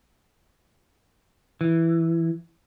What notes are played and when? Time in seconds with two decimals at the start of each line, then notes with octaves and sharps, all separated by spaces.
1.61 E3